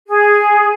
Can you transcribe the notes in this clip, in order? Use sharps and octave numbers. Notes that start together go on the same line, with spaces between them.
G#4